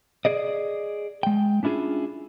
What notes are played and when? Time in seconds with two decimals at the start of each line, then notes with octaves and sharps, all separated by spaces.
0.25 G#4 D5 D#5
1.23 G#3 G5
1.63 C#4 D4 E4 F4 G#4